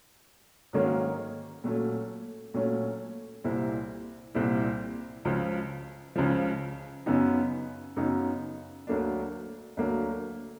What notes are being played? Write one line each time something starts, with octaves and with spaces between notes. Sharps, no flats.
G#2 D#3 F#3 A#3 C#4
A#2 F#3 A3 C#4
A#2 F#3 A3 C#4
C2 A#2 G3 C4 E4
C2 A#2 G3 C4 E4
C#2 C#3 F3
C#2 C#3 F3
F#2 C#3 F#3 B3 D#4
F#2 C#3 F#3 B3 D#4
D2 D3 F#3 A#3 D4
D2 D3 F#3 A#3 D4